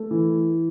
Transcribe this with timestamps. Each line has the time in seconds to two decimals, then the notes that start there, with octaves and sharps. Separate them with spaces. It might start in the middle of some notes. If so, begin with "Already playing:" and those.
Already playing: A3
0.11 E3